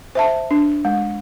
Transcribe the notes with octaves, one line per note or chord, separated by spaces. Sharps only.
C5 E5 A5
D4
G#3